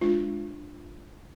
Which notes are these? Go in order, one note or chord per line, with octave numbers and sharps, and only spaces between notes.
G#3 D4 F4